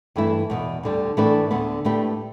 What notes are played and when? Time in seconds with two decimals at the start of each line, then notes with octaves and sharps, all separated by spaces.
0.16 G2 E3 A3 E4
0.50 E2 B2 B3
0.83 D2 D3 G3
1.17 A2 E3 A3 D4 B4
1.51 D2 D3 B3
1.85 A2 A3 D4 G4 B4